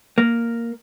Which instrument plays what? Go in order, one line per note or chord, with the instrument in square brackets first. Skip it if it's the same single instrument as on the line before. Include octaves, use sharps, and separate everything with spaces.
[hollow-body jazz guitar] A#3